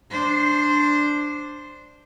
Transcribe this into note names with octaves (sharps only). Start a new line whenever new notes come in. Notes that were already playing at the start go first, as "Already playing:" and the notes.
D4 C5